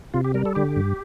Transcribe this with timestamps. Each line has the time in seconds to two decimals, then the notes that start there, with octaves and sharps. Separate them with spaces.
0.14 C3 F4
0.24 G4
0.34 G3 A#4
0.45 A4
0.55 D3 G4
0.76 G2